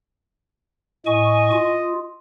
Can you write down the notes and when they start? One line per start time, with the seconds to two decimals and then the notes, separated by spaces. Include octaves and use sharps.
1.06 A2 D#5 G#5 C#6
1.52 F4